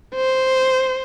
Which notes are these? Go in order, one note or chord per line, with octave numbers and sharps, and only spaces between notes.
C5